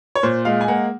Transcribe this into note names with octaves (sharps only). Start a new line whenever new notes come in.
C#5
A#2 C5
G#3 F5
G#5
A#3 F#5